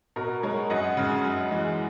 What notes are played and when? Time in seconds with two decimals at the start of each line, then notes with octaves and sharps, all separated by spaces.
0.16 B2 A#4
0.43 G#3 A#4 C#5
0.70 F#2 D#5 F#5
0.97 C#3 G#3
1.24 F#2
1.51 E3 G#3